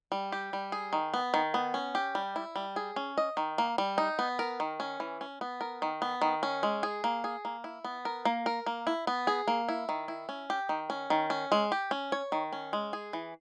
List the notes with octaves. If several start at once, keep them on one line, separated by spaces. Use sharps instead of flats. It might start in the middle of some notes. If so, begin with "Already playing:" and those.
G3
G4
G3
G#4
D#3
B3
D#3
B3
C#4
G4
G3
E4
G3
G#4
C#4
D#5
D#3
A#3
G3
D#4
B3
A#4
D#3
C#4
E3
C#4
B3
A#4
D#3
B3
D#3
C#4
G#3
G#4
A#3
G#4
A#3
E4
B3
A#4
A#3
A#4
A#3
E4
B3
G#4
A#3
E4
D#3
E4
C#4
G4
D#3
C#4
D#3
C#4
G#3
G4
C#4
C#5
D#3
C#4
G#3
G#4
E3